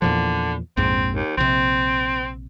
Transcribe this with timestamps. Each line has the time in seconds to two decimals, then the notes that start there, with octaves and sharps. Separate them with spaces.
0.02 E2 A#2 D3 F3
0.77 A#1 F2 G#2 C4
1.15 D#2
1.37 A#1 C3 C4